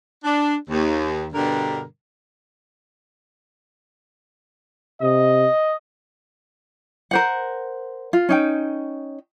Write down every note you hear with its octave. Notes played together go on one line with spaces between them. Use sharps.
D4
D#2
G2 B2 D3 G3 A#4
C3 D#5
A#4 C5 F#5
F4
C#4 D#4 G5